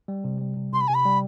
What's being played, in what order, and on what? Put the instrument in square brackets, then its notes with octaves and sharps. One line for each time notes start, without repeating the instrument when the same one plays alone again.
[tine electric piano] G3
C3
G3
C3
[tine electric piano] C3 [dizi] C6
[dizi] B5
[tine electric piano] C3 [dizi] G#5
[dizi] B5
[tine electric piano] G3